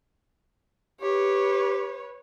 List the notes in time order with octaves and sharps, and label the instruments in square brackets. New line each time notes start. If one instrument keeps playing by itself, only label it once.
[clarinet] G4 [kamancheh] B4 C#5